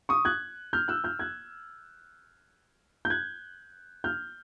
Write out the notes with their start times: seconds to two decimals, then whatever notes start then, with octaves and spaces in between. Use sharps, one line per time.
0.09 C#6 D#6
0.25 F#6 G#6
0.73 F6 G6
0.88 E6 F#6
1.04 F6 G6
1.19 F#6 G#6
3.05 G6
3.10 F#6 G#6
4.04 F6 G6